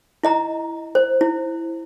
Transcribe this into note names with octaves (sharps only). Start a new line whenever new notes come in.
E4 D#5 A#5
C5
E4